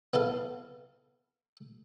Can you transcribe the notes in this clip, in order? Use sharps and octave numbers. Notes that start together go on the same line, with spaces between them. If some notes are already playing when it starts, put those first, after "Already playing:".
B3 E4 A4 F5